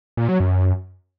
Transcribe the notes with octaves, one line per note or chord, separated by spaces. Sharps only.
A#2
F#3
F#2